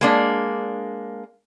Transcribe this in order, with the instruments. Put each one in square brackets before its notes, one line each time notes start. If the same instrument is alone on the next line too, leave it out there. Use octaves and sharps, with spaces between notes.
[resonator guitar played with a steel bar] G#3 A#3 D4